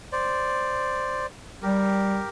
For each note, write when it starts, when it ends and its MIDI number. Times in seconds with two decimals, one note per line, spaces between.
0.12 1.26 72
0.12 1.26 74
1.62 2.21 55
1.62 2.29 67
1.62 2.29 70